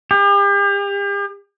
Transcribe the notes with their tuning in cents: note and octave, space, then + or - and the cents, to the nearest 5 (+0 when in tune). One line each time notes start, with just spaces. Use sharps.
G4 +40